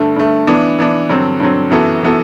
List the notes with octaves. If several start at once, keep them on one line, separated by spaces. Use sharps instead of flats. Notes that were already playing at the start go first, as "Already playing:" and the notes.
Already playing: G2 D3 A3
G2 D3 A3
E3 B3 D4
E3 B3 D4
G2 D3 F#3 C4
G2 D3 F#3 C4
F#2 E3 B3 F#4 A4
E3 B3 F#4 A4